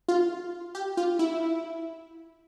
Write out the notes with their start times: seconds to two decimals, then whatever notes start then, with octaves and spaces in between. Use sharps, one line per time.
0.08 F4
0.75 G4
0.97 F4
1.19 E4